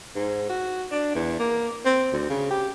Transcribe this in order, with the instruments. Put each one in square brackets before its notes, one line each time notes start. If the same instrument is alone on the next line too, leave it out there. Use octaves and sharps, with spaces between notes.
[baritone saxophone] G#2
F#4
D4
E2
A#3
C4
D2
C#3
G4